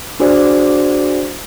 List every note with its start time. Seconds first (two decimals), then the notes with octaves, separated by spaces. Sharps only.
0.20 D4 F#4 G#4 C5 D5